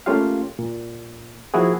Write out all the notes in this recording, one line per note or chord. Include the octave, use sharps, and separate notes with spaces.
A3 A#3 C#4 F4 G4 F5
A#2
F3 A#3 E4 F#4 G#4